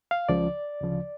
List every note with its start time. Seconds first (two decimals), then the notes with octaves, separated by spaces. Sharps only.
0.11 F5
0.29 C#2 C#3 F3 D5
0.81 D2 C#3 F3